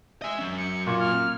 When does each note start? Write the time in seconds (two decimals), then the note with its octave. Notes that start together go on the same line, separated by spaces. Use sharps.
0.22 D#5 E5 G#5
0.38 F#3 C#4
0.57 C#7
0.87 A#2 C#6
0.99 F6